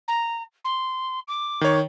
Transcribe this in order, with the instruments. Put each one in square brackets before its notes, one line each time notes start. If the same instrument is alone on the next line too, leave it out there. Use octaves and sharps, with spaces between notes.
[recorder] A#5
C6
D6
[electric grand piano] D#3 C#5